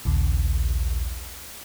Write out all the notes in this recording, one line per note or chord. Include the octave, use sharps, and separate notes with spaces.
A#1 D#2 C#3